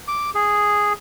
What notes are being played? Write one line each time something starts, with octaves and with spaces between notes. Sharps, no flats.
D6
G#4